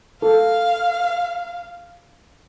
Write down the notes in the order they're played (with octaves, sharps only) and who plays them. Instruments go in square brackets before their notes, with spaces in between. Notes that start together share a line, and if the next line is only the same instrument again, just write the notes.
[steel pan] A4 [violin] F5